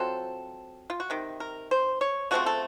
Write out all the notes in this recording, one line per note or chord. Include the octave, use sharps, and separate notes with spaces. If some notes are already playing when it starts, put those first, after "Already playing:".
Already playing: F#3 C4 F4 A4
F4
F#4
C3 D#3
A#4
C5
C#5
C#3 F3 A3 C4 F#4
A4